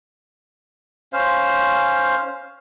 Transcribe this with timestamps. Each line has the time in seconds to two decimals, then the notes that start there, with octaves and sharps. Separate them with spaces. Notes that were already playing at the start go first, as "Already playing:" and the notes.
1.13 C#4 C5 F5